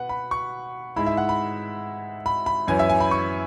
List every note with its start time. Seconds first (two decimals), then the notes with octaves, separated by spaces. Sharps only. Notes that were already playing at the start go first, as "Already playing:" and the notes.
Already playing: B2 B4 F#5
0.09 B5
0.31 C#6
0.96 G#2 G#3 E4 B5
1.06 E5
1.17 F#5
1.29 B5
2.26 B5
2.46 B5
2.68 F#2 E3 C#4 G#5
2.79 E5
2.90 G#5
3.00 B5
3.11 C#6